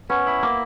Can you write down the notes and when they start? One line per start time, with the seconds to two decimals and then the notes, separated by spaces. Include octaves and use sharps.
0.09 B3 C#4
0.27 E4
0.43 A#3